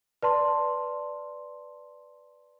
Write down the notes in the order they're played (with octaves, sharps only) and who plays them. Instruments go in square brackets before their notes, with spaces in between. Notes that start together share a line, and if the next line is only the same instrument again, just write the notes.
[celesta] B4 D5 A5 C6